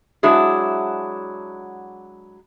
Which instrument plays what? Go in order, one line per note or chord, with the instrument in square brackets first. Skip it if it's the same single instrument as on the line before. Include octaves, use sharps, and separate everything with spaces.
[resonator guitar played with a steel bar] F#3 G#3 D4 E4 F#4 G#4